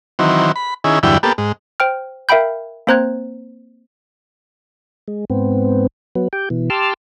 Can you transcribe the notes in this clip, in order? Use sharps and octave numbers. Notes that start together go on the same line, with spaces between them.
D#3 E3 F#3 C4
B5
D#3 C#4 E4 G#4
E2 G2 D3 F#3 E4 G5
A#3 B3 G4 A4
G#2
C5 G5 F6
A#4 E5 F5 G5 B5 G6
A#3 C4 C5 A#5 F#6 G#6
G#3
G#2 B3 C4
F#3 B3
G4 G5
B2 E3
G4 A5 C6 D6 E6 F6